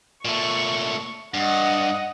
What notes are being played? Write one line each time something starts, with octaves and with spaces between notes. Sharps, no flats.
A#2 A3 C#6
G2 D#5 F#5